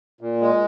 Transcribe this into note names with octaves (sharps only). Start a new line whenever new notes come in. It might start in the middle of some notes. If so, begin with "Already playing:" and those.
A#2
G#3